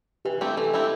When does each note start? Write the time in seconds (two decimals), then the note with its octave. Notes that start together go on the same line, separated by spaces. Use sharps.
0.25 E3 G4
0.41 A3 C4 E4 G4
0.57 E3 A4
0.73 A3 C4 E4 G4